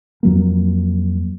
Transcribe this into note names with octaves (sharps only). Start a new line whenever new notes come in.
F2 F#3 A#3